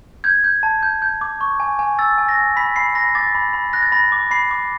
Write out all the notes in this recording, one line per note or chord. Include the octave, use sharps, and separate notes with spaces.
G6 G#6
G6
A5
G6
G6
D6
C#6
G#5
G#5
E6 A6
G#5
A#6
G#5
B5 B6
B5 C7
B5 A#6
D6 A6
B5
B5
F#6 A#6
A6
B5 A#6
D6
B5 C7
D6